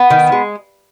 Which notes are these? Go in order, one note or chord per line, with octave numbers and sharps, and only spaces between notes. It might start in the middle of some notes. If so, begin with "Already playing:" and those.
Already playing: B3
D#3
G#3